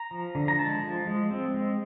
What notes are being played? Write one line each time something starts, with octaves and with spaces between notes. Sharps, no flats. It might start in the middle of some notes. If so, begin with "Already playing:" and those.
Already playing: A#5
F3
D3
A#5
G#3 A5
F3
G#3
C4
G#3